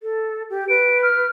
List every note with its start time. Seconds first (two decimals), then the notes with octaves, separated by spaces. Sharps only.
0.03 A4
0.50 G4
0.69 B4 D7
1.03 F6